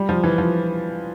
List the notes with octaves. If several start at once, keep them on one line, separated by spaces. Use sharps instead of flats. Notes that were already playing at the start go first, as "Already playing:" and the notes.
Already playing: G3
F3
E3
F3